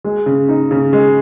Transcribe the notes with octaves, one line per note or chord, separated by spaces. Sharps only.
G#3
C#3
D#4
C#3
G#3